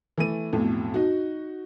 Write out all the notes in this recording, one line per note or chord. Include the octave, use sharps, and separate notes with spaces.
E3 A3 D#7
B1 F2 A2
D#4 F#4